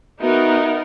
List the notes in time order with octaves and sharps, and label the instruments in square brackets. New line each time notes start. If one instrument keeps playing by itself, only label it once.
[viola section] B3 D#4 A#4 [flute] F#4 [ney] E5